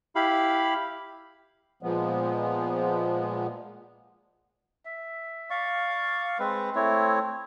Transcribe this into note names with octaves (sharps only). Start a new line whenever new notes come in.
E4 G4 F5 B5
A#2 F3 G#3 B3
E5
D5 F5 C#6
G#3 C4 B4
A3 C4 E4 C#5